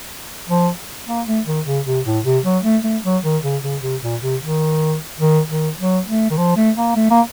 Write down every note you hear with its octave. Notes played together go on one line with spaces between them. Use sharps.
F3
A#3
A3
D#3
C#3
C3
A2
C3
F#3
A3
A3
F#3
D#3
C#3
C#3
C3
A#2
C3
D#3
D#3
D#3
F#3
A3
D#3
F3
A3
A#3
A3
A#3